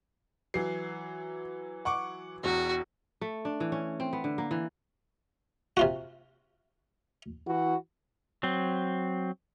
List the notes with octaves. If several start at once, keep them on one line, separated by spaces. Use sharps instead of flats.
E3 F#3 C7
F#5 C#6 D6
E1 E2 F#4
A3
D4
E3
C#4
C4
B3
D3
A#3
E3
C3 F4 F#4
E3 E4 F#4
F#3 C4